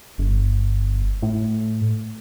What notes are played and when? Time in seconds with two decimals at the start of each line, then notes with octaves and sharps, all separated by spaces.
0.18 G1
1.22 A2